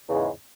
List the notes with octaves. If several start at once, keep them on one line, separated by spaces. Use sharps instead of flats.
E2 G#2 C#3